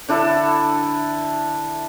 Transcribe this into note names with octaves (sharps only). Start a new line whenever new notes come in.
D3 D4 E4 A4